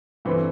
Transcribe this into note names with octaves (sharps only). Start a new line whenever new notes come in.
G2 E3 A3 C4